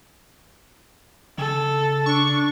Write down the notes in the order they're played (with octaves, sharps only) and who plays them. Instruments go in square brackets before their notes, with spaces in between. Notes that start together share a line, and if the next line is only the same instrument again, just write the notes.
[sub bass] C#3 [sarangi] A4
[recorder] D4 [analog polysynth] C#6